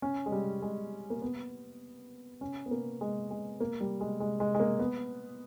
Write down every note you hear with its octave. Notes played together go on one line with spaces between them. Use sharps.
C#4
G#3
G3
G#3
A#3
B3
C#4
B3
A#3
G#3
G#3
A#3
G3
G#3
G#3
G#3
G#3
A#3
B3